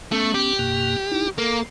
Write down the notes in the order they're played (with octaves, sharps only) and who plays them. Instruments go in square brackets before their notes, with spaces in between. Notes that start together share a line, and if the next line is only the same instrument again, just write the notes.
[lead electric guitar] A3 [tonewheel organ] B3 C#4
[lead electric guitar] G4
[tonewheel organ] F#2 B2 A#3
D#4 E4
[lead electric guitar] A#3 [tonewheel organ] A4